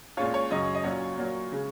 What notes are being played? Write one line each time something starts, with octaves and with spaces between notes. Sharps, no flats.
A#2 G#3 C#4 F4 C#5
C#5
F#2 C#3 F#3 D#5
D#5
A#2 F#3 C#4 F4 C#5
A#2 F#3 A#3
C#3 G#3